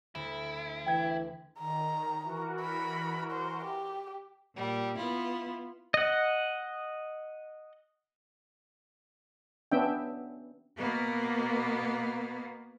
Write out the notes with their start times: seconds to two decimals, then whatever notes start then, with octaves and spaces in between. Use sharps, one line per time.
0.15 D2 E4
0.86 E3 G5 G#6
1.59 D#3 A#5
2.23 E3 F#4 A#4
2.61 B5
3.32 C5
3.65 G4
4.55 A#2 G3
4.96 B3 E4 F4
5.94 D#5 F#5
9.72 B3 C#4 D4 E5 G5
10.77 B2 A#3 B3